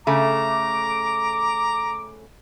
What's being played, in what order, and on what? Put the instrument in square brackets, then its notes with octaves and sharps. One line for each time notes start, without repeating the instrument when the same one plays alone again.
[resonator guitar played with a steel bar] C#3 A3 [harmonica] A#5 [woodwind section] D6